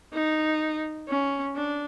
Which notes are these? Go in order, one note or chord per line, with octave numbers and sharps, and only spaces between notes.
D#4
C#4
D4